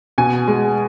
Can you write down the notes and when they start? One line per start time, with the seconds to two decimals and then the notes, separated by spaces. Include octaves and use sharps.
0.18 B2 G#5
0.48 G#3